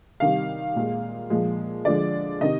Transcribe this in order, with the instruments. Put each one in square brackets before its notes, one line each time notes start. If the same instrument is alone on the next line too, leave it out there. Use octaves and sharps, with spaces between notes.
[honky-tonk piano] C3 D#3 G3 F5
A#2 G#3
A#2 F3 G#3
D3 F3 G#3 D5
C3 D#3 D#5